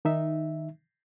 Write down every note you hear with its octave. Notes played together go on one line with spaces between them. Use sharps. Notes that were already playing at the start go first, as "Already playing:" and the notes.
D#3 D#4 E5